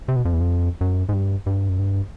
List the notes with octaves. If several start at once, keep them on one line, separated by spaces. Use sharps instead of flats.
C3
B2
F2
E2
F2
F#2
G#2
G2
G2
F#2
G2